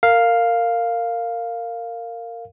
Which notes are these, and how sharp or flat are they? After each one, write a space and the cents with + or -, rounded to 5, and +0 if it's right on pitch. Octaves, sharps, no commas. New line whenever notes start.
A#4 -20 F5 +0